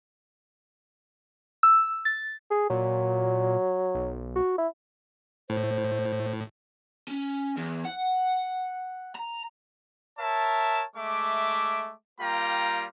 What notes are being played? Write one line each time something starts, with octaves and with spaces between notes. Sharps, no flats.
E6
A6
G#4
A#2 F#3
B1
F#4
E4
A2 C5
C#4
E2
F#5
A#5
A#4 C#5 E5 A5
G#3 A3 E5 D6
G3 A#3 F4 G5 A#5